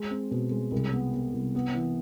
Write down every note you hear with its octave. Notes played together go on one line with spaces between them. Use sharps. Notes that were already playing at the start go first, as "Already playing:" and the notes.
Already playing: G#3
C4
B2
G#3
C2
B3
B3
C2
B3
E3